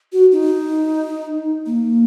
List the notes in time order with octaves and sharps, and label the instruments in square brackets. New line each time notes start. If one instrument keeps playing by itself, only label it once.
[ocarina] F#4
D#4
A#3